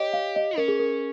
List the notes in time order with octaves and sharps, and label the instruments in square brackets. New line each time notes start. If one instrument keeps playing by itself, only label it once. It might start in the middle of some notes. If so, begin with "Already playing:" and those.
Already playing: [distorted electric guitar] G4 [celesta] C#5 D#5
[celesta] F5
D#5
[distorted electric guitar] C#4 [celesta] A#4
[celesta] G#4
A#4